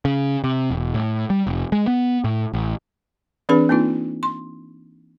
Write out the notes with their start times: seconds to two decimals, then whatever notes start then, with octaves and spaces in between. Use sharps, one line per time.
0.05 C#3
0.44 C3
0.71 E1
0.95 A2
1.30 G3
1.47 F1
1.72 G#3
1.87 B3
2.24 A2
2.54 A1
3.49 E3 C4 D4 G#4 B4 B5
3.69 A#3 C4 D#4 F4
4.23 C6